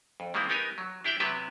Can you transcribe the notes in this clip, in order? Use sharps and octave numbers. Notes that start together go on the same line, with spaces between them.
F2
D#3 G3 G#3 A#3 C4 E4
B3 D#4 G4 A#4 G#5
F#3
D4 E4 G4 D5 E5 G5
C3 F#3 B3 G4 B4 E5